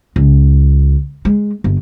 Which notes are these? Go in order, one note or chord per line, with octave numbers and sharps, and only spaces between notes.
C#2
G#3
G1